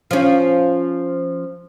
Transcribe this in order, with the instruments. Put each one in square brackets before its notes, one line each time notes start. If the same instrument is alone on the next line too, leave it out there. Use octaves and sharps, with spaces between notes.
[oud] F3 C#4